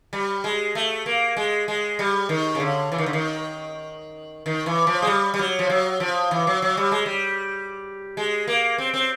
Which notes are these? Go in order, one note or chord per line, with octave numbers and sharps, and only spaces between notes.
G3
G#3
A3
A#3
G#3
G#3
G3
D#3
C#3
D3
E3
D#3
D3
D#3
D#3
E3
F3
G#3
G3
G3
F#3
F3
F#3
F3
E3
F#3
F#3
G3
G#3
G3
G#3
A#3
C4
C4